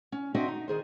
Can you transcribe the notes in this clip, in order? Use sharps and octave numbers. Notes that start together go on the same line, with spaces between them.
C#4
C4 D4 F#4 C5 D#5 E5
D#4
D#3 G#4 C5